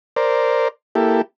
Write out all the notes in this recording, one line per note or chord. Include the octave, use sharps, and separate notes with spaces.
A#4 C5 D5
A#3 E4 G4 A4